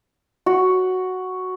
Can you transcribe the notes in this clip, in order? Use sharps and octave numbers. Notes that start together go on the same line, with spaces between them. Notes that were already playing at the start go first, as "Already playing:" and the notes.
F#4